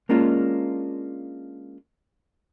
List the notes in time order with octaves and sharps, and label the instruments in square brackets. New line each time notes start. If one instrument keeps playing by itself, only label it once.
[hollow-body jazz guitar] G#3 A#3 C#4 D4 F4